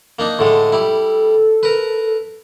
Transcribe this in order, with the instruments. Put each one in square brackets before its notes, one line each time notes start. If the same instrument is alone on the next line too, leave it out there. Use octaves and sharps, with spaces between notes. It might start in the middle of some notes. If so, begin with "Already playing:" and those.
[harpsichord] A#3 D4 D#4
[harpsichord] A2 D3 G#3 [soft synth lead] A4
[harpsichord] G3 E4
A#4 B4